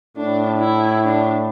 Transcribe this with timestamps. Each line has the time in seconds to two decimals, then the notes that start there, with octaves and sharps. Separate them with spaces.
0.17 A2 D4
0.60 E4
1.04 D4